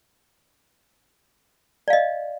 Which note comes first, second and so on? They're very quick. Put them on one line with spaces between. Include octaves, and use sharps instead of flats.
D5 F5 D#5